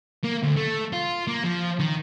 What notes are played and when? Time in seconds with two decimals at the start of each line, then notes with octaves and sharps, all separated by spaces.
0.24 A#3
0.43 D2
0.57 A3
0.93 F4
1.27 A#3
1.44 F3
1.80 D#3